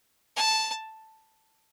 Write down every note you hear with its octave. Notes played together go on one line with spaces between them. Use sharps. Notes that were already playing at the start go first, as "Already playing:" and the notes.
A5